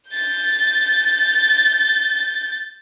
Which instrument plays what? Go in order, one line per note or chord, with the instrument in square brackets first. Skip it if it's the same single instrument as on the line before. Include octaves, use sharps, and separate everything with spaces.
[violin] G6 A6